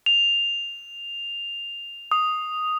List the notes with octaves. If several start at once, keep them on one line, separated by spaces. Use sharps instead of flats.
F7
D#6